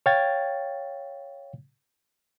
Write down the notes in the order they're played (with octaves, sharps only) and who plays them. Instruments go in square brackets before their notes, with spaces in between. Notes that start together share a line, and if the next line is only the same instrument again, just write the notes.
[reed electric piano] C#5 F5 G5 G#6 A6